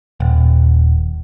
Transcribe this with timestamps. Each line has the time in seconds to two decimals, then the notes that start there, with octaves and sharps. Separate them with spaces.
0.20 D#1